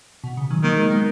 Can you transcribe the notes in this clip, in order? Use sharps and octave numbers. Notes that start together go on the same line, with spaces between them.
B2
C#3
D#3 F#3
D#3 F#3 A#3
G#3 B3
G#3 B3